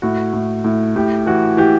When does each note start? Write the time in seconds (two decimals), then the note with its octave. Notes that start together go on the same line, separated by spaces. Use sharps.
0.02 A2 F#4
0.33 A2
0.64 A2
0.96 A2 G4
1.26 E3 F#4
1.57 E3 G4